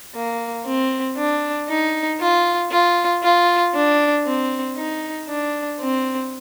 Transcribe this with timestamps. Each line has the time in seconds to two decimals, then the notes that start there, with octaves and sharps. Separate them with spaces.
0.15 A#3
0.66 C4
1.17 D4
1.70 D#4
2.21 F4
2.72 F4
3.23 F4
3.75 D4
4.26 C4
4.77 D#4
5.29 D4
5.80 C4